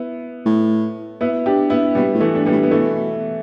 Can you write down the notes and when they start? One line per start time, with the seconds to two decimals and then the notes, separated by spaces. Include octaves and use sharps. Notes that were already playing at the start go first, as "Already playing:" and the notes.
Already playing: B3 E4
0.46 A2
1.21 B3 E4
1.46 D4 G4
1.70 B3 E4
1.95 B2 G3 B3
2.15 A2
2.21 E3 A3
2.35 D4
2.46 G3 B3
2.52 A2
2.63 B3
2.71 B2 E3 A3